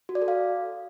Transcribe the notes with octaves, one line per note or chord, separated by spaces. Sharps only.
F#4
D5
A4
F5